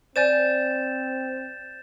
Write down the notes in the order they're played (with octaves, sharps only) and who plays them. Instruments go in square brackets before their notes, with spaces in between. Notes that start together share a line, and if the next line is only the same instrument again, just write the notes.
[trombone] C4 [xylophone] C5 D5 G#5 [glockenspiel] G6 A6 E7